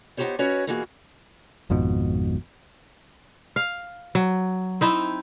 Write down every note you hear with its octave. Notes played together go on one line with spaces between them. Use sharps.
B3 D#4 F4 G4 C5 C#5
C#4 F#4 B4 C#5 D#5
B2 E3 A#3 F#4 G#4
G#1 F2 G#2 B2
F5
F#3
C4 D#4 E4